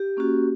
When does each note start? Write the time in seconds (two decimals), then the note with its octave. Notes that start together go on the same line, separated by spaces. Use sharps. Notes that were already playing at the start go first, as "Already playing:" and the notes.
Already playing: G4
0.17 A#3 C#4 F#4